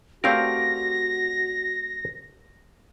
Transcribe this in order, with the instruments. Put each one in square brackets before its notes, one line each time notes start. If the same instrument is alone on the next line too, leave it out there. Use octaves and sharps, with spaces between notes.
[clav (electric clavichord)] A3 C4 A#4 [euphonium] F#4 [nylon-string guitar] G4 D5 F5 [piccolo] A#6